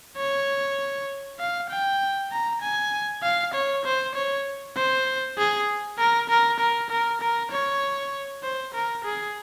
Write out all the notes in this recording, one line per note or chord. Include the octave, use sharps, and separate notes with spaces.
C#5
F5
G5
A#5
G#5
F5
C#5
C5
C#5
C5
G#4
A#4
A#4
A#4
A#4
A#4
C#5
C5
A#4
G#4